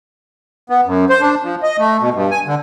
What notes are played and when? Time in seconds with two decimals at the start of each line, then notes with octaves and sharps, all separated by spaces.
0.70 B3
0.86 F#2
1.09 C5
1.21 D4
1.43 F3
1.63 D#5
1.79 A3
2.00 B2
2.14 G2
2.31 G#5
2.46 D3